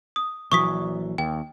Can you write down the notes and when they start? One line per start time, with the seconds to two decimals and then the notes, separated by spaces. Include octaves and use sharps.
0.16 D#6
0.52 A#1 E3 F#3 C#6 D#6 B6
1.18 D#2 G5